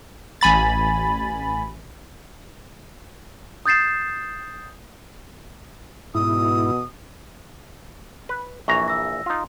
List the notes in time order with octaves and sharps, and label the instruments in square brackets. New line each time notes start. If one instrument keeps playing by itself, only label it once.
[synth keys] A1 G#5 B5 A6
[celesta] D#6 G6 A6 C7 E7
[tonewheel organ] G#2 E4 [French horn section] B2 [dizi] D#6
[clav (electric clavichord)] B4
[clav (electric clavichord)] A#1 E3 A#5 [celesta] C#6
[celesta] E6 A#6
[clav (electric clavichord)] D#4 F4